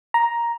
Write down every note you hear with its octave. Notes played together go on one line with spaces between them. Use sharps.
A#5